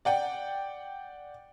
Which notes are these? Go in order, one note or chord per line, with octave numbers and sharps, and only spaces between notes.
D5 F#5 G5